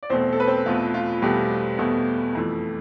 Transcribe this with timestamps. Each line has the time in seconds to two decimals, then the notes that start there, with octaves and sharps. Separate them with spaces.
0.03 D5
0.10 E2 B2 A3 C4 C5
0.32 A4
0.40 B4
0.47 C4 C5
0.66 E2 B2 A3 F4
0.94 F4
1.22 E2 B2 G3 A3 G4
1.79 E2 B2 A3
2.35 F2 E3 A3